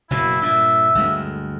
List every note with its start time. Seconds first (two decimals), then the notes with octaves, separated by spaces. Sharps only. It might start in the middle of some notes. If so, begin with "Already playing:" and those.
0.10 F#1 B2 E4
0.41 G2 A#2 E5
0.95 G1 D2 G#3